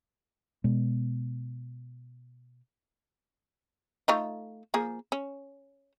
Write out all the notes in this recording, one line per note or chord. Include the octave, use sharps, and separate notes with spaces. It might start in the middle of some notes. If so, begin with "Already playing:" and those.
B2 G#3 B3
A3 D#4 F4
F3 A#3 G#4
C#4